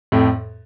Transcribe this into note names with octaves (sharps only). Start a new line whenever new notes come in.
F2 A2